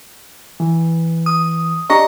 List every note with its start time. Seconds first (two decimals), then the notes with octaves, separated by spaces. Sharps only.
0.60 E3
1.26 D#6
1.90 D4 G4 D#5 A#5 C#6 A#6